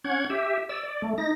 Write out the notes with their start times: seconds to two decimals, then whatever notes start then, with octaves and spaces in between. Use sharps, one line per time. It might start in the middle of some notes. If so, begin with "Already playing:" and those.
0.04 C#4 F#5 G#6
0.30 G4 E5
0.69 D5 E6
0.83 D5
1.02 A3
1.18 D#4 A#6